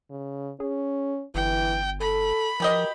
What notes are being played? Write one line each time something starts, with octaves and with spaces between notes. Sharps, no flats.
C#3
C#4 G#4
G1 E3 G5
A4 B5
B2 F3 G4 A#4 D#5